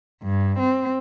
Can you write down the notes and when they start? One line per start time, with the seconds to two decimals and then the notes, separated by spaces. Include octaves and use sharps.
0.22 G2
0.59 C4